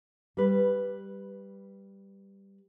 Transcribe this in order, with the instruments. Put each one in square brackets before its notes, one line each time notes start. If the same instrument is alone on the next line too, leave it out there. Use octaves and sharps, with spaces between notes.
[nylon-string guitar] G3 B4